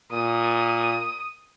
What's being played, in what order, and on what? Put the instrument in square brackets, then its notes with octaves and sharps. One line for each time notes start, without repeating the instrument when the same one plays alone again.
[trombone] A#2 [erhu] D#6